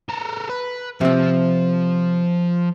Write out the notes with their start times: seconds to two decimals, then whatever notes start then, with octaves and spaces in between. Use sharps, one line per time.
0.09 A4 A#4
0.49 B4
1.01 C3 F3 C4 F4